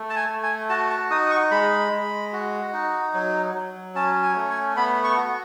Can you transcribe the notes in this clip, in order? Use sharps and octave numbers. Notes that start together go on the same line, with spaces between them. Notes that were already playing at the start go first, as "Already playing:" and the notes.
Already playing: A3
A5
G#5
A3
G#5
F#4 A5
A5
D#4 D#6
D#6
C#6
G#3 B5
G#3
F#4
D#4
F#3
F#3
C#4 A5
G#5
A3
G#5
B3 B5
C#6
F#4